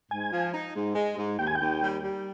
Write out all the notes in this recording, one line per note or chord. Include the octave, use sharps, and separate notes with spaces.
G#2 G#5
F3
D#4
G#2
G#3
G#2
D#2 G5
G#5
D#2 G5
G3
G3